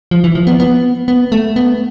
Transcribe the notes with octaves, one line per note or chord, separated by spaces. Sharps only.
F3
E3
F3
B3
B3
B3
A3
B3